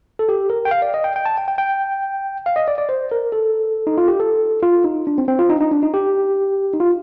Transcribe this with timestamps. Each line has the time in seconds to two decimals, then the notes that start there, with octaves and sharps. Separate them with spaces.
0.19 A4
0.29 G4
0.50 A#4
0.65 G5
0.71 F5
0.82 D5
0.94 D#5
1.04 G5
1.16 G5
1.26 A5
1.38 G5
1.48 G5
1.58 G5
2.46 F5
2.56 D#5
2.68 D5
2.78 D5
2.89 C5
3.12 A#4
3.32 A4
3.87 D#4
3.98 F4
4.08 G4
4.20 A4
4.62 F4
4.84 D#4
5.07 D4
5.18 C4
5.28 C4
5.39 F4
5.50 D#4
5.56 D4
5.61 D#4
5.71 D4
5.83 D#4
5.94 G4
6.74 D#4
6.80 F4